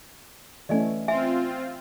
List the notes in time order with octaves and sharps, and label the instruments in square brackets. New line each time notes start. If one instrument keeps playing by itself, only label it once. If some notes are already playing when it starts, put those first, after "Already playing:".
[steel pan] E3 A3 C#4 [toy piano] D5 D#5 G#5
[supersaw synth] C4 F4 [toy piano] E5 G#5